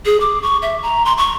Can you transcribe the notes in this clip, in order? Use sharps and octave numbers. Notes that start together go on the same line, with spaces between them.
G#4
D6
C#6
E5
A#5
C6
C#6